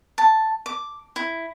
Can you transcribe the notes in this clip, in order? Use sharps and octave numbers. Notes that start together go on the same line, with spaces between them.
A5
D6
E4